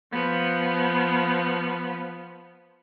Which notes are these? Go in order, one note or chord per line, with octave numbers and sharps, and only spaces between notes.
F3 B3